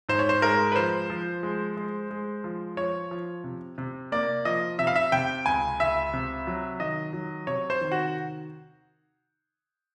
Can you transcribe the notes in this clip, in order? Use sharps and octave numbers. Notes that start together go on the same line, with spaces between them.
G#2 C5
C#5
C5
G#3 A#4
B4
F3 C5
F3
G#3
G#3
G#3
F3
F3 C#5
F3
C3
C3
A#3 D5
F3 D#5
C3 E5
F5
E5
C3 G5
C#2 G#5
C#2 E5
C3
F#3
D#3 D#5
F#3
C3 C#5
C5
D#3
F#4